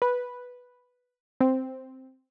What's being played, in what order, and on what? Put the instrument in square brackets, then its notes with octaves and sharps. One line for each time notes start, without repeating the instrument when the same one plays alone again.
[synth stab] B4
C4